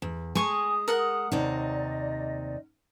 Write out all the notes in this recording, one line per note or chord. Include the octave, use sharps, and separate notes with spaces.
E2
G#3 G#5 C#6 D#6
A#4 F#5
D#2 C3 D#4 D5 D#5